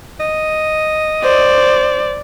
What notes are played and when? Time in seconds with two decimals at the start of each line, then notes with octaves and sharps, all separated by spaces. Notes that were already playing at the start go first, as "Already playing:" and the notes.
0.20 D#5
1.23 C5 D5